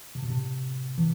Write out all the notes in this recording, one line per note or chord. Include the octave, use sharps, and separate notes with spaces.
C3
B2
A2 C3
C3 E3